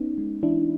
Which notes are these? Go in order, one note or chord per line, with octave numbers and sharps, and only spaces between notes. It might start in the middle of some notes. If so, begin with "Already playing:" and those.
Already playing: B3 C#4 D#4
G#3
E3 D4 E4